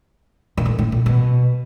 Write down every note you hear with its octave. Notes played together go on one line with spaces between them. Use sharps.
A#2
A2
A2
A#2
B2